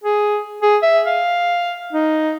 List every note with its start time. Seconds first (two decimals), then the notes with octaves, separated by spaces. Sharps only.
0.04 G#4
0.62 G#4
0.82 E5
1.07 F5
1.93 D#4